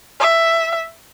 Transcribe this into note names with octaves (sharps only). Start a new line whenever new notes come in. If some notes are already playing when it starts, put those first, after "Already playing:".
E5